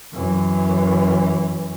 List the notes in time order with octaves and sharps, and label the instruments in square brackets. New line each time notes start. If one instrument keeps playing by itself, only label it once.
[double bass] F#2 E3